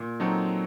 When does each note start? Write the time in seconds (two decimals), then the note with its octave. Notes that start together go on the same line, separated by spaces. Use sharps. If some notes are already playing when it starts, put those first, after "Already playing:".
Already playing: A#2
0.20 F#3 C4 D#4 A4